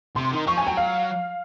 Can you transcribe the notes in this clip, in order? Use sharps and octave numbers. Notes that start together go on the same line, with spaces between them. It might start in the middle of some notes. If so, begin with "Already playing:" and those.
C3 C6
D#3
F3 C#6
G#5
F#3 G5
F5